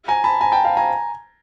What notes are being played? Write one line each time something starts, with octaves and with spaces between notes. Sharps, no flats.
G#5 A#5
A5 B5
G#5 A#5
G5 A5
F5 G5
G#5 A#5